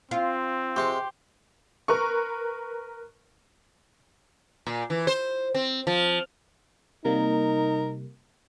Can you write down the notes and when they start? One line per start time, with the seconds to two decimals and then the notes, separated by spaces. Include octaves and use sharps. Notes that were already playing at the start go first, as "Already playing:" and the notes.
0.11 C4 F4
0.76 C3 G#3 G4 C5 C#6
1.88 A#4 B4 C#6
4.67 A#2
4.90 E3
5.07 C5
5.54 C4
5.87 F3
7.05 C3 G3 A#3 D#4 A#4